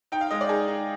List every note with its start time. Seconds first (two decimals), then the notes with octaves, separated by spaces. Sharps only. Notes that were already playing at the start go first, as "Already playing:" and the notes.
0.12 D#4 G5
0.21 F5
0.31 G#3 D#5
0.41 D5
0.49 D#4 G#4
0.68 D#4